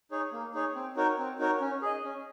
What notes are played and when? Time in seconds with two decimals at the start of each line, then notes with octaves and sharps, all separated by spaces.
0.11 D#4 G#4 C#5
0.33 A#3
0.54 D#4 G#4 C#5
0.75 C4
0.96 D#4 F#4 A#4 C#5
1.18 C4
1.39 D#4 F#4 A#4 C#5
1.61 C#4
1.82 G#4 D#5
2.04 C#4